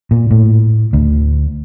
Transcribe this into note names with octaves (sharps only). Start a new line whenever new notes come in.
A#2
A2
D2